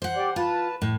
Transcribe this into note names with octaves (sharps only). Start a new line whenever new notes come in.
C5 F#5
G4 D5
F4 B4 A5
A2